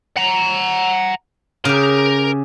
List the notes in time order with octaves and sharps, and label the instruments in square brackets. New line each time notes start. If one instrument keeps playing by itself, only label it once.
[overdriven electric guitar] F#5 A#5
[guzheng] C#3 G4 [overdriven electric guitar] A#4